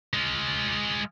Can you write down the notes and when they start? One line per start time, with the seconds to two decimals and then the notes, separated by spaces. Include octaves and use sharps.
0.13 G#3 F4